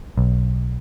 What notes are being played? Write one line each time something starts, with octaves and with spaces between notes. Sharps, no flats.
B1